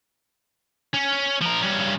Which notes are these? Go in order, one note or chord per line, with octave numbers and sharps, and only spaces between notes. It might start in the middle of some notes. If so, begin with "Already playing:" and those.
C#4
F3 A#4
G2 C#4